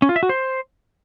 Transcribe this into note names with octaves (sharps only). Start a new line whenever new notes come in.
C#4
F4
E5
F#4
C5